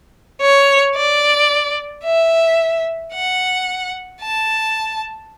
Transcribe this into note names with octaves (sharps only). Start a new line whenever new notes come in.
C#5
D5
E5
F#5
A5